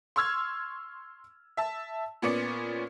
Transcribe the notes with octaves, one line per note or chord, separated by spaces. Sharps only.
C6 C#6 E6 F6 G#6
E5 A5
A#2 B3 C#4 D5 C#7